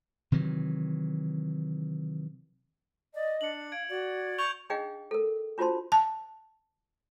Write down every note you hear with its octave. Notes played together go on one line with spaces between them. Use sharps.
C3 D#3 E3 F#3
D5 D#5
D4 C#7 F#7
F5 G#6 D7
F#4 D5
C#6 G6 F7 G7
D4 D#4 G#4 D#5 F5 G5
A4 A#4
D4 F4 F#4 C5 A5 C6
A5